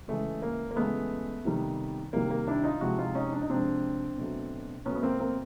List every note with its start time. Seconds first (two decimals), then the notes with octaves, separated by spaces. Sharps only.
0.08 C#3 E3 G#3 A3
0.42 A#3
0.71 A#3
0.76 C#3 E3 G#3 A3 B3
1.45 C3 D#3 G3
2.13 C3 D#3 G3 A#3
2.31 A#3
2.47 D4 E4
2.63 D#4 F4
2.81 C3 F3 G#3 E4 F#4
2.98 D#4 F4
3.15 C#4 D#4
3.32 D4
3.41 D#4
3.49 C3 F3 G#3 C4 D4
4.18 B2 F#3 A3
4.85 B2 F#3 A3 B3 C#4
4.95 B3
5.02 A#3 C4
5.19 A#3 C4